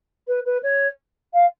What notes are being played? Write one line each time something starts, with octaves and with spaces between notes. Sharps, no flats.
B4
B4
C#5
F5